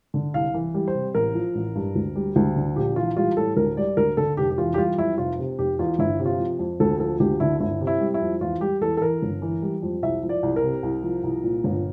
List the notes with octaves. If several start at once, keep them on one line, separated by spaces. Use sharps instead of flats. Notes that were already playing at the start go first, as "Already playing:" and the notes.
D3
C2 F5
E3
G3
C5
C3
A1 A#4
F3
A1
G2
D2
G3
D2
D3
A#1 G4
E3 F4
G3 F4
A2 A4
D2 A#4
G3 D5
D2 A#4
D3 A4
F1 G4
G4
E3 F4
G4
G3 F4
F2 E4
F1 F4
C3
F1 G4
E2 F4
G1 E4
C3
F4
F3
F2
D2 A4
F3 A4
D2 G4
D3 E4
G1 E4
C3
E4
G3
E4
F2
E2 F4
G3 G4
E2 A4
A4
E3 A#4
G1
E3
G3
F2
C2 E5
F3
D5
C2
A#4
C3
C2
F3
C2
A#2
G1